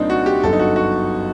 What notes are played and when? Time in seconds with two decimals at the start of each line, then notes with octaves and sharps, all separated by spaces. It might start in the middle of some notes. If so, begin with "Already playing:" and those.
Already playing: C2 A#2 C4 D4 D#4
0.10 F#4
0.26 G4
0.43 G1 F#2 D3 A4
0.53 D#4
0.59 F#4
0.76 F#4